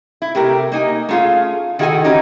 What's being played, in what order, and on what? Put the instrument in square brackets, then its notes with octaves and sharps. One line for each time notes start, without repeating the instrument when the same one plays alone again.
[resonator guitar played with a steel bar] E4
C3 A3 G4 A#4
A#3 D#4 G#5
A3 C#4 F4 G#4 F5
D#3 E4 F#4 G#4 A4 G#5
E3 C#4 D#4 G4